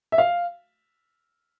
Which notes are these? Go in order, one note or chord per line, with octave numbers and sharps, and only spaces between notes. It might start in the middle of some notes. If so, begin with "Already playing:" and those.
E5
F5